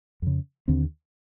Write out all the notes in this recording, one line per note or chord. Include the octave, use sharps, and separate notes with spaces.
F2 C#3
D#2 D3 C4